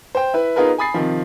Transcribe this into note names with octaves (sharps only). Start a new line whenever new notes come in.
C5 G5
E4 B4
B3 D#4 F4 G#4 A#4 B4
G#5 B5 D#6 A6 C7
C3 D#3 F3